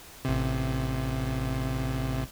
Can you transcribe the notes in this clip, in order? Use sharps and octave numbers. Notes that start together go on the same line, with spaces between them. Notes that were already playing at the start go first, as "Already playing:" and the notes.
A1 C3